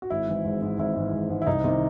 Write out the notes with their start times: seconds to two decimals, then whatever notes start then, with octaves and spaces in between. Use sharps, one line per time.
0.02 F#4
0.10 G#1 E4
0.28 G#2 E3
0.45 G#1
0.61 G#2 E3
0.79 G#1 E4
0.95 G#2 E3
1.13 G#1
1.29 G#2 E3
1.42 E4
1.47 C2 D#4
1.64 C3 D#3